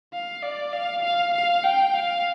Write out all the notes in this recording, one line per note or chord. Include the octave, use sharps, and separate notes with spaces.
F5
D5
F5
F5
F5
G5
F5